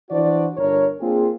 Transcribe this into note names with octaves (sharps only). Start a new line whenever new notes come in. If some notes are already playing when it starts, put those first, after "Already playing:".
E3 D4 F#4 C5 D5
G1 D4 A#4 C#5
A#3 C4 D4 F4 G#4